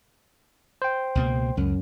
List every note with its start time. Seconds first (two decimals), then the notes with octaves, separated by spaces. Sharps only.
0.82 C5 G5
1.15 C#2 B2 A#3
1.57 C#2 F#2